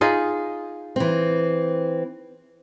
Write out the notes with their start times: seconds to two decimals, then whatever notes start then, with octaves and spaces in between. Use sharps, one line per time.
0.01 D#4 F4 G#4
0.96 E3 C4